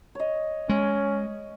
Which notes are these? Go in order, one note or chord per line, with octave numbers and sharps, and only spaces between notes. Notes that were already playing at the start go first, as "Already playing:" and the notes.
C#5 D#5
G#3 C#4